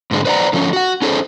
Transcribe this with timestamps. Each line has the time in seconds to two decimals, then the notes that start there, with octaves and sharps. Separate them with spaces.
0.11 G#2 D3 G3 G#3
0.25 B4 C5 D5 D#5 F#5 A#5
0.53 D3 F3 A3 A#3 C#4
0.73 F#4 F#5
1.02 C#4 D#4 G#4 A4 B4 C5